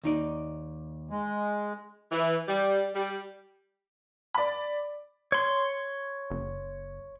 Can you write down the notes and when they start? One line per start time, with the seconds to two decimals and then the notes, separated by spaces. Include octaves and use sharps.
0.04 D#2 D#4 D5
1.11 G#3
2.11 E3
2.48 G3
2.94 G3
4.35 D5 B5
5.32 C#5 C6
6.31 F#1